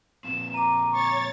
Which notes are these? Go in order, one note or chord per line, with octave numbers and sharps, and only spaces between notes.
A#2 F3 C4 E7
A#5 D6 D#7
C#5 C#6 A6